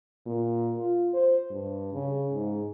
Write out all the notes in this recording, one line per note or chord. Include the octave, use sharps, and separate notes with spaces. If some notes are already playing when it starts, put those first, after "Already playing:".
A#2
F4
C5
G2
C#3
G#2